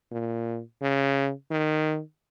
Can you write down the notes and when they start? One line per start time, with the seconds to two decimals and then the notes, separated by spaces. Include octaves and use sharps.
0.11 A#2
0.82 C#3
1.51 D#3